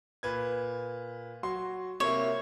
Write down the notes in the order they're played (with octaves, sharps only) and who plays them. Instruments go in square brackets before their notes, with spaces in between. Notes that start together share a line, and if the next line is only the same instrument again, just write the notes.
[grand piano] A#2 B4 G#6
F#3 F#4 C6
[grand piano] C3 A#3 E4 [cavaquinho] C#5